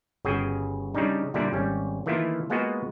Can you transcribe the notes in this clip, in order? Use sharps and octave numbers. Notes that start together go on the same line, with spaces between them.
G1 C#3 F#4 G#4 G5 G#5
C#3 G3 D4 D#4
A#2 D3 G3 E4 D5 A5
G#1 G3 C#4
D#3 E3 A3 A#3 E4 F4
G#3 A#3 B3 F4 F#4 D#5